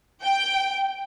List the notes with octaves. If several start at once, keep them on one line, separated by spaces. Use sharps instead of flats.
G5